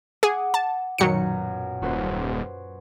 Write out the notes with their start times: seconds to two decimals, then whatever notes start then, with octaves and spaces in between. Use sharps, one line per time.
0.23 G#4 F#5 D6
0.54 A5
0.98 B1 F#2 A#2 D#3 F#3 C#7
1.82 D#1 F#4 B4 C5